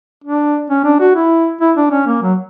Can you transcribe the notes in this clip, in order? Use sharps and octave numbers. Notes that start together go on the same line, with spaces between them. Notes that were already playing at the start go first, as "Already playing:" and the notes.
D4
C#4
D4
F#4
E4
E4
D4
C#4
A#3
F#3